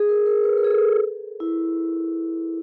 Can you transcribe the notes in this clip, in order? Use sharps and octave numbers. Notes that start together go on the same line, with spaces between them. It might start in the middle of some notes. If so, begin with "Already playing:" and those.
Already playing: G#4
A#4
A#4
B4
A#4
G#4
A4
E4